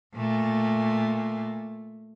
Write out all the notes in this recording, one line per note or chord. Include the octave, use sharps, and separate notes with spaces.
A#2 A3